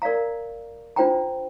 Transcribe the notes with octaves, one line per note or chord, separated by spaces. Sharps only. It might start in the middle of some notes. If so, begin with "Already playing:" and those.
A#4 D5 F5 A#5
D4 F4 C5 G5 A#5